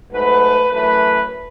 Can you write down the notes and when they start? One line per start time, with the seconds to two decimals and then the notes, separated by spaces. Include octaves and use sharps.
0.12 G#2 F#3 A3 B4
0.72 F#2 E3 A3 B4